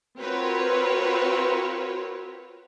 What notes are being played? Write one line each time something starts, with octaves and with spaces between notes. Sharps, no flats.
C4 F4 F#4 A#4 B4 C#5